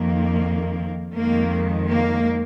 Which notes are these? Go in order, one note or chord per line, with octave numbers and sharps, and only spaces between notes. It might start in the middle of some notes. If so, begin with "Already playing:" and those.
Already playing: F2 D#3 A#3
F2 D#3 G#3 A#3
A#3